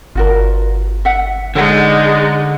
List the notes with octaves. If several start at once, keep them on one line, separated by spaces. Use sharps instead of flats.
G1 F4 F#4 A#4
E5 F#5
D3 G#3 D#4 A4 C#5 F#5